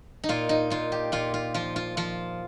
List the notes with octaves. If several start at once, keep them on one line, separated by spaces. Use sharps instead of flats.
D#4
A#2 F4
D#4
A#2 F4
G4
A#2 F4
F4
F3 F4
F4
F3 F4